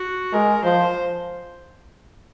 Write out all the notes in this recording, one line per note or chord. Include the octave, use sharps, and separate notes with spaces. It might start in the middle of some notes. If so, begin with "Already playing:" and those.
Already playing: F#4
G#3 A#4
F3 C5